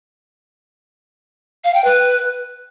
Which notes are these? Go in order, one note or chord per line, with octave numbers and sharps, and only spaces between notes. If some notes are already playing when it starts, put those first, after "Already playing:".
F5
G5
B4